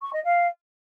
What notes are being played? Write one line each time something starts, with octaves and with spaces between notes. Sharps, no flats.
C#6
D#5
F5